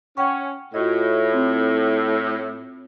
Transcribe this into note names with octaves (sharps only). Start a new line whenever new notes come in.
C#4 F#5 G5 C#6
A2 F4 F#4 D#5
C4